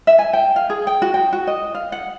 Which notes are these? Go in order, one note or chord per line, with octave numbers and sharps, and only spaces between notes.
E5
G#5
G5
F5
G#4
G5
F#4
G5
F#4
D#5
F5
F#5